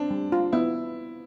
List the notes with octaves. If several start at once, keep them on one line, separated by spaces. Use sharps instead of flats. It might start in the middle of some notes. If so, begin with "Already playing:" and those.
Already playing: C4 D4
G3
F4
B3 E4